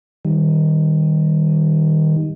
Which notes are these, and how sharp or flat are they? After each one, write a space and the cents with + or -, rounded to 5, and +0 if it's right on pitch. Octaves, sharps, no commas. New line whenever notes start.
D#3 +0 G3 +0